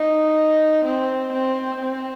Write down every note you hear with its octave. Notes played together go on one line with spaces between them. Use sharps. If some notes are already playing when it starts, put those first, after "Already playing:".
Already playing: D#4
C4
C4
C4